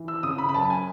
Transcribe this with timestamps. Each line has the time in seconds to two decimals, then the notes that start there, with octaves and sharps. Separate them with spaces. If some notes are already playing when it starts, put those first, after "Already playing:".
Already playing: E3
0.08 E6
0.23 C#3 D#6
0.38 B5
0.49 B5
0.54 F#2 A5
0.70 G#5